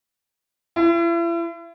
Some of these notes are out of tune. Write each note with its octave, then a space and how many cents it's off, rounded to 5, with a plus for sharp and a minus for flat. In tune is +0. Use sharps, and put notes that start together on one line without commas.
E4 +40